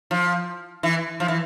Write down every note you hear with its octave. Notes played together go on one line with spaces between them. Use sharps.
F3
E3
F3
E3